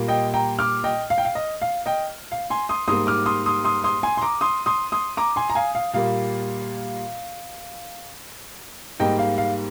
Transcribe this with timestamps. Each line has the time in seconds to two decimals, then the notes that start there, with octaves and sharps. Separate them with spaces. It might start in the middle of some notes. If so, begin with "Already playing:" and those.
Already playing: A#2 G3 A#3
0.08 D#5 G5
0.34 G5 A#5
0.59 D6 F6
0.84 D#5 G5
1.10 F5
1.18 G5
1.25 F5
1.35 D#5
1.62 F5
1.86 D#5 G5
2.32 F5
2.50 G#5 C6
2.69 C6 D#6
2.88 G#2 G3 A#3 C6 D#6
3.07 D6 F6
3.26 C6 D#6
3.46 C6 D#6
3.65 C6 D#6
3.84 C6 D#6
4.03 G#5 C6
4.17 C6
4.22 A#5 D6
4.41 C6 D#6
4.66 C6 D#6
4.92 C6 D#6
5.17 A#5 D6
5.36 G#5 C6
5.50 A#5
5.55 F5 G#5
5.75 F5
5.93 A#2 G3 A#3 F5
9.00 G#2 G3 A#3 D#5 G5
9.19 F5
9.38 F5